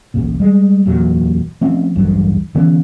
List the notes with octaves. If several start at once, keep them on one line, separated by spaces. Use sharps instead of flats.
A1 D2 A#2
G3 G#3
D1 E2 A#2 F#3
F3 A3 C4 C#4
A1 D2 G2 F#3
D3 E3 B3 C#4